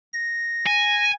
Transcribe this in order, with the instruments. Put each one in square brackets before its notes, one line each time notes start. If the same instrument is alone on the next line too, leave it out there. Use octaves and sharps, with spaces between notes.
[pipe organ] A#6
[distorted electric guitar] G#5